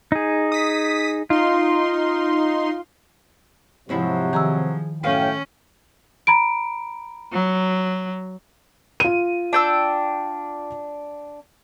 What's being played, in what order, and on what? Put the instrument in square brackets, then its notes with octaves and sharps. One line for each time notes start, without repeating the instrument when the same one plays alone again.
[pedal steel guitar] D#4 G#4
[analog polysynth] D#6 B6
[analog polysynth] D#4 C6 [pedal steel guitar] F4
[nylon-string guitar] G#2 C4 E4 [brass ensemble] C3 F#3 [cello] F3
[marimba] D#3 A#5 E6 [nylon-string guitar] G#4
[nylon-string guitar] F#2 F5 [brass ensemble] A2 G5 [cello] C#4
[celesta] A#5 B5 D7
[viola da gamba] F#3
[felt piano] F4 D#7
[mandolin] D4 G5 E6